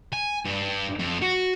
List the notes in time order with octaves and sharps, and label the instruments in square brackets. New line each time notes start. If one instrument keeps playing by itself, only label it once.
[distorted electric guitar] G#5
G2
F2
F#4